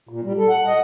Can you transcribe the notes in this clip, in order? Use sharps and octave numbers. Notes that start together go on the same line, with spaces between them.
A#2
G3
A4
F#5
D#5